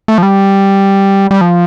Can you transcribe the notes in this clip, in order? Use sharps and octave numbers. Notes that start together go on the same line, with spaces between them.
A3
F3
G3
G3
F3